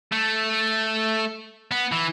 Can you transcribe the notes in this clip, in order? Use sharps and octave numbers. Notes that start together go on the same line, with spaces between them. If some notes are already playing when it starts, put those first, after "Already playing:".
A3
B3
E3